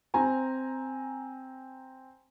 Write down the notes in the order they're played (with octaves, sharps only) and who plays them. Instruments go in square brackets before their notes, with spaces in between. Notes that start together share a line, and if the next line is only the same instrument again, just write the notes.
[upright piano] C4 G#5 A#5